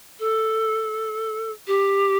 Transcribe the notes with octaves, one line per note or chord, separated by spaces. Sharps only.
A4
G4